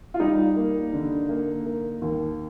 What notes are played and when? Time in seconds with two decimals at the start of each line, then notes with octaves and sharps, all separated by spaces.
0.14 F4
0.20 G3 D#4
0.56 A#3
0.93 D3
1.29 A#3
1.66 A#3
2.02 D#2